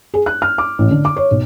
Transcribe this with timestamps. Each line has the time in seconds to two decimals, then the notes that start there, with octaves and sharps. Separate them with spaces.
0.14 G#4
0.26 F#6
0.42 F6
0.58 D6
0.78 A1
0.91 D3
1.05 D6
1.16 C#5
1.31 B1